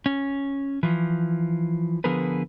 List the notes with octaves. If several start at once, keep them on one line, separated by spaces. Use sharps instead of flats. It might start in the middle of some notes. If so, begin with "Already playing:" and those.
C#4
E3 F3
D3 F3 B3 G#4 A#4 B4